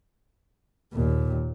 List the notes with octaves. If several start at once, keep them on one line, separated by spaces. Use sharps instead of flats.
D#2 A#2